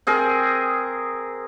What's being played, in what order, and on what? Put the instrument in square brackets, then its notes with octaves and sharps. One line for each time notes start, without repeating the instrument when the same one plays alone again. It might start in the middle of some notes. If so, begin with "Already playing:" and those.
[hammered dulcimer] C4 G#4 A#4